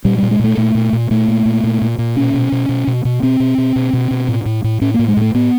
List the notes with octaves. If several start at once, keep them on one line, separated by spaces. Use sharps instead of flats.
A#2 G3
G3
A#2
G#3
A#2 A3
A#2 A3
A#2
A#2
A#2 A3
A#2
A#2
A#2
A#2
A#2
B2 C#4
B2
B2
B2
B2
B2
B2 C4
B2
B2
B2
B2
B2
A2
A2
A2
A2 C#4
A#3
A2
G#3
A2 A3
A2 B3